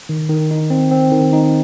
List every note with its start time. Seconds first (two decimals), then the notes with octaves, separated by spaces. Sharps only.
0.09 D#3
0.29 D#3
0.51 D#4
0.70 C4
0.91 C4
1.12 D#3
1.33 D#4